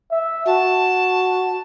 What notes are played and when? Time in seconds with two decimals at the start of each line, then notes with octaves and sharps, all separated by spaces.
0.11 E5
0.46 F#4 A5